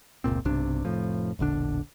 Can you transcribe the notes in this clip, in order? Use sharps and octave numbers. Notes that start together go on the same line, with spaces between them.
F1 C#2 A#2 C4
B1 G2 C3 D4
F1 A2 F3
E1 A#1 D3 D4